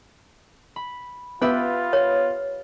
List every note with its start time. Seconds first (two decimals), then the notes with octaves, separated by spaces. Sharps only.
0.76 B5
1.42 B3 F4 G4 B4 E5
1.93 C#5